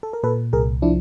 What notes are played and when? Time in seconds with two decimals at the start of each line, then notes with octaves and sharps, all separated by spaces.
0.03 A4
0.13 A#4
0.23 A#2 A4 B4
0.53 C2 G#4 A#4
0.82 F3 D4 E4